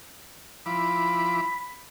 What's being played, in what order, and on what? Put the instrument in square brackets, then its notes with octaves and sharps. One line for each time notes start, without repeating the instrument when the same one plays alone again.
[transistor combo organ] F3 E4 D6 [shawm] B5